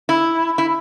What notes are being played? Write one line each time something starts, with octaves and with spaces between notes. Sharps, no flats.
E4
E4